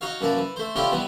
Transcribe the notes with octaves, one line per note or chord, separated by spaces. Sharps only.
D#4 F#4 C#5 F5
F#2 E3 A#3 D5 A5
E3
A3 C5
C#4 E4 F4 G4 C5 D5
E3 G3 B3